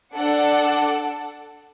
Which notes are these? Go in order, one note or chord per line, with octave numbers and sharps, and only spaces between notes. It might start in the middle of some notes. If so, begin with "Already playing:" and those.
D4 A4 D5 F#5 A5